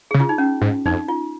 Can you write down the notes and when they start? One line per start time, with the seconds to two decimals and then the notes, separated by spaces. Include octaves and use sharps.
0.11 C#3 G#4
0.20 F4
0.29 D#4
0.38 C#4
0.62 G#2
0.86 F2 D#4
1.08 F4